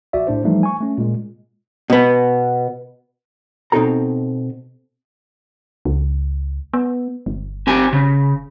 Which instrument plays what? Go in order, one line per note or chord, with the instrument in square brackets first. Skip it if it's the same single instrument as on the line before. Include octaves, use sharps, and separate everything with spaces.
[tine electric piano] A#1 F#4 D5 E5
A2 D4 C5
E3 F3 G3 A3 D#4
G#5 C#6
A3 C#4
A#2 G#3
[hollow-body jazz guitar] B2 B3
B2 C4 D#4 F4 A4 A#5
[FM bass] C#2
B3
G1
[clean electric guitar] C4 G4 G#5
C#3